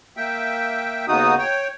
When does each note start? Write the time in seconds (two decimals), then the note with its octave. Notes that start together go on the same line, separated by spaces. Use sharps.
0.17 A#3 E5 G5
1.08 D#2 C#3 B3 D#4 F#4 D#6
1.38 C#5 G5